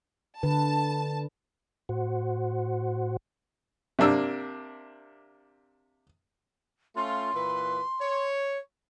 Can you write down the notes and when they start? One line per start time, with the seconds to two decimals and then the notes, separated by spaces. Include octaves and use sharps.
0.43 D3 B4 A5
1.89 A2 F#4 C5 F#5
3.99 C3 A#3 D4 E6
6.96 A3 C#4 F4 C6
7.34 A#2 E3 B4
8.00 C#5